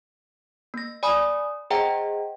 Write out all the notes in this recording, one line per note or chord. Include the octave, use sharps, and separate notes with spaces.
A#3 A#6
D5 G#5 B5 D#6
G#4 C5 D#5 F#5 G5 A#5